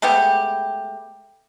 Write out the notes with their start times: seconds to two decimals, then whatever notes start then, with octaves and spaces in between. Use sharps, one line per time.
0.02 G#3 A3 B3 G4